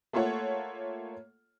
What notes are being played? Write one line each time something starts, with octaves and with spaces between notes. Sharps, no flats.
A3 A#3 F4 A4 C#5 F#5